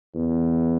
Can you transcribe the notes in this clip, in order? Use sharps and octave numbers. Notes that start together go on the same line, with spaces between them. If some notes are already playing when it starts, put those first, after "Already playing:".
E2